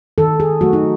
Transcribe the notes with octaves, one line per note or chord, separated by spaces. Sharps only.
D#3 A4
G#4
F#3 A3 F#4
D#4